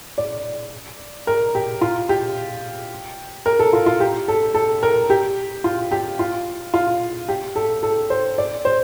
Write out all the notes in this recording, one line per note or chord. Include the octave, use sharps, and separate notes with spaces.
D5
A#4
G4
F4
G4
A#4
A4
F4
F4
G4
A4
A4
A#4
G4
F4
G4
F4
F4
G4
A4
A4
C5
D5
C5